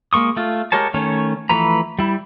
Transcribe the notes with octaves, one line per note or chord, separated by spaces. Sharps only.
G#3 A#3 C#6 D#6
A3 F4
G#3 G4 A#4 C#5 A5
D#3 A3 C#4 C#5
E3 F3 A3 B4 A#5
G3 E4